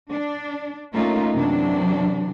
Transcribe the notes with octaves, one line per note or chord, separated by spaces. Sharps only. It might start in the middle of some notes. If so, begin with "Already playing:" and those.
D4
A3 A#3 C#4 D#4 F4
F#2 C3 E3 F#3 D4